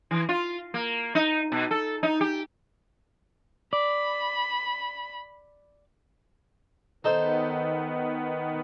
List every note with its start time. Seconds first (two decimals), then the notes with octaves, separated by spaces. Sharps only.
0.11 E3
0.29 F4
0.74 A#3
1.15 D#4
1.52 B2
1.71 A4
2.03 D#4
2.21 G4
3.73 D5 B5
7.04 D#3 B3 D#4 A4 C5